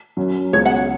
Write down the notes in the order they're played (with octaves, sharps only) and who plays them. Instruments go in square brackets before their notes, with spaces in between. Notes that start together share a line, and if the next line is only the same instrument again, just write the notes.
[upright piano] F#2 F#3 C#4
[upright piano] C#2 B2 G#3 C#4 [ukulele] C#5
[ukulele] F#5